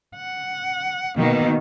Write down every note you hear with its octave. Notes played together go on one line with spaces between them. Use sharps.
F#5
B2 D#3 A#3